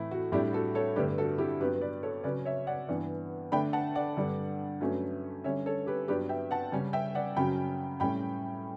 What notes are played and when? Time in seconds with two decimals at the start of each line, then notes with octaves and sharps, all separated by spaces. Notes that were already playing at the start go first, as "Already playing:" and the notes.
Already playing: A2 E3 A3 E4
0.11 F#4
0.32 A2 G3 D4 E4 G4
0.53 F#4 A4
0.75 A4 C#5
0.96 G2 D3 A3 D4 G4 B4
1.18 F#4 A4
1.38 E4 G4
1.60 G2 F#3 B3 G4 B4
1.81 B4 D5
2.03 A4 C#5
2.24 C#3 F#3 C#4 B4 D5
2.45 C#5 E5
2.67 D5 F#5
2.88 G2 E3 B3 D4
3.52 D3 A3 D4 G5 B5
3.73 F#5 A5
3.95 D5 F#5
4.17 G2 D3 G3 D4
4.81 G2 F#3 A3 C#4
5.44 D3 G3 C#4 C#5 E5
5.66 A4 C#5
5.87 G4 B4
6.08 G2 F#3 B3 D4 G4 B4
6.29 E5 G5
6.51 F#5 A5
6.72 C#3 G3 C#4
6.93 E5 G5
7.15 D5 F#5
7.36 F#2 C#3 F#3 G5 B5
8.00 A2 G3 C#4 G5 B5